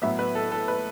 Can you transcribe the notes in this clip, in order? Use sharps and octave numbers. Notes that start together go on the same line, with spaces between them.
A2 F#3 B3 E5
B4
A4
A4
B4